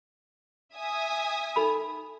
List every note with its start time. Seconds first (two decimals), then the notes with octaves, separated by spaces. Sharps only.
0.74 E5 G#5 D#6
1.56 D#4 A4 B5